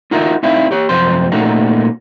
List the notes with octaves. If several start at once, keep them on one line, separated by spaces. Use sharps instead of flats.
D#4 F4 F#4 A#4 D#5 E5
C4 D#4 E4 E5 F5
G4 C#5
F#2 C3 F3 C5 C6
A#2 A3 A#3 C#4 D#4 F#4